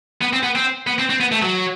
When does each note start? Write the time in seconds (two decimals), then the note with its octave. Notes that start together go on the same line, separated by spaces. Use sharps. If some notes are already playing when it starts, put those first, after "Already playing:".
0.21 B3
0.33 C4
0.43 B3
0.55 C4
0.87 B3
0.99 C4
1.10 C4
1.20 B3
1.32 A3
1.42 F#3